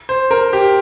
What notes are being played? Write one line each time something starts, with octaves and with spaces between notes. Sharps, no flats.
C5
A#4
G4